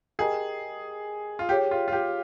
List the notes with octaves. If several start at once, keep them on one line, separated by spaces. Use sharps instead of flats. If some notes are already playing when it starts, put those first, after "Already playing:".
G4 G#4 A#4 D#5 G5 A#5
F4
G4 G#4 C#5 G5
F4
F4
G4